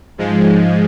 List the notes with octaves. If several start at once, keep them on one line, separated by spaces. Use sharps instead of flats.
G#2 F3 G#3